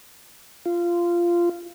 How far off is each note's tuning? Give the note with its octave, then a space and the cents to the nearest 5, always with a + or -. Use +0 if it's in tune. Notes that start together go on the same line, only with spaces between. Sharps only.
F4 -15